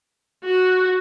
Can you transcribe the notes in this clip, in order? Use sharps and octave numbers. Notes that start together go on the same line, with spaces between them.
F#4